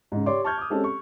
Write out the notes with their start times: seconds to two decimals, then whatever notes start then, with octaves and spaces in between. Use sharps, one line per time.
0.12 G#2 C#3
0.26 G4 C#5 D5 C6 D6
0.44 A5 C#6 F6 G6 G#6
0.58 D6 D#6
0.70 G#3 C4 C#4 G4 A4
0.84 C#6